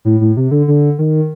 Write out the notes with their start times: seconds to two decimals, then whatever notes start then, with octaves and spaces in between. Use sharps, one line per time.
0.05 A2
0.21 A2
0.37 C3
0.51 D3
0.68 D3
0.99 D#3